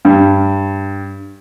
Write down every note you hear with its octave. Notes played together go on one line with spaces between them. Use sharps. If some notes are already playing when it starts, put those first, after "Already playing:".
G2